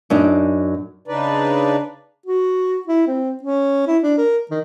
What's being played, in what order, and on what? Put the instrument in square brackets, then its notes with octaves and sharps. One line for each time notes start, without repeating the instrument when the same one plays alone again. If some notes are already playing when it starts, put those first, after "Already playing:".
[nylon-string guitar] F#2 D4 D#4
[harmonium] C#3 D4 D#4 B4 D5
[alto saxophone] F#4
E4
C4
C#4
E4
D4
A#4
D#3